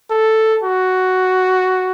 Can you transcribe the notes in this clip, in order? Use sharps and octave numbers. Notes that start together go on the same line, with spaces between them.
A4
F#4